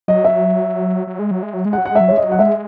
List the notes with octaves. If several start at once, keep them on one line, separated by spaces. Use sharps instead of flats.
F#3 D#5
E5
F#3
G#3
F#3
G#3
F#3
G#3
F#5
F#3
G#3 F#5
F#3 E5
G#3 C#5
D#5
F#3
F#5
G#3 E5